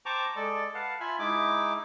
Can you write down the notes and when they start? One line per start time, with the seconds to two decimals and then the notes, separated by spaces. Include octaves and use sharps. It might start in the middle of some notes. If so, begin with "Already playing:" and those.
0.06 C5 G5 A5 A#5 C#6 D6
0.36 G#3 A4 D5
0.75 B4 F5 F#5 A5
1.00 F4 E5 G#5 B5
1.19 G#3 D#4 E4 D6